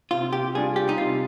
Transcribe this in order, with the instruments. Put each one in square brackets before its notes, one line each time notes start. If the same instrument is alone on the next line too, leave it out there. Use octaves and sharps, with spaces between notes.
[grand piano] C3 [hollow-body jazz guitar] F4
[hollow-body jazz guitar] G4
[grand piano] G3 D4 F4 [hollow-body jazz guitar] G#4
[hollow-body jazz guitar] G4
D#4
[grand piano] C3 [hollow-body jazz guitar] F4